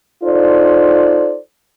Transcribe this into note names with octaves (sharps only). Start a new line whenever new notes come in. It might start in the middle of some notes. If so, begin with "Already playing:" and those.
D#4 F4 A4 C5 D5